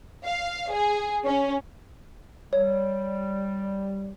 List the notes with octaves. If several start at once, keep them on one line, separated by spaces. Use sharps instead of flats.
F5
G#4
C#4
G3 C#5